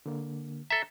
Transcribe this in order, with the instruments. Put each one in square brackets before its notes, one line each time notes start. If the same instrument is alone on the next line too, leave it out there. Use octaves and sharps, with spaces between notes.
[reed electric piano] D3 A#3
[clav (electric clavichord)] A4 E5 [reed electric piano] A#5